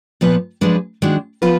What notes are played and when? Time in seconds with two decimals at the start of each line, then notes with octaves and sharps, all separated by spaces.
0.21 A#2 F3 B3 F4 B4
0.61 F3 G#3 D4 G#4 B4
1.02 D#3 G#3 D4 F#4
1.42 F3 B3 F4 B4